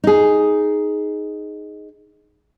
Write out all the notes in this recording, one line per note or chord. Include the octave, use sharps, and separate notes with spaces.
D#4 G#4